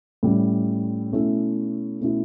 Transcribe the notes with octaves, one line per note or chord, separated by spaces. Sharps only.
A2 G3 C#4
B2 A3 C#4 E4
B2 A3 C#4 E4